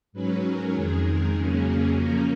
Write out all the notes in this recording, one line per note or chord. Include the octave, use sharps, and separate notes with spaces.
G#2 F#3 C#4 B4
A#4
F2 D#3 G#3 G#4
A#4
F2 C#3 F#3 A#3 C#4 G#4
C#3 F3 A#3 C#4 A#4